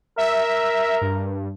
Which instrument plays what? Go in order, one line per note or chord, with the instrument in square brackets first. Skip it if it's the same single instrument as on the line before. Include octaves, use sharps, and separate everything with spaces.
[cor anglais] A#4 [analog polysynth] E5
[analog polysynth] G2